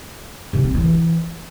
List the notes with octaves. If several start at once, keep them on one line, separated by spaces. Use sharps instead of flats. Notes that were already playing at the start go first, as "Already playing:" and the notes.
C3
C4
E3